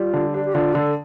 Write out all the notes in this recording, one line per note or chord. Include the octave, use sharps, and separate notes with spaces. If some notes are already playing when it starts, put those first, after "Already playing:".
Already playing: G3 F4
D3
D4 G4
G4
D3 F4
D3 A4